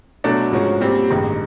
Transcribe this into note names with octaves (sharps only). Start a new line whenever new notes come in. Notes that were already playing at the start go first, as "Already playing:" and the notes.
B2 F#3 A3 D4
G#2 F3 G#3 C#4 F#4
A#2 G3 C4
A1 G2 D#3 G#3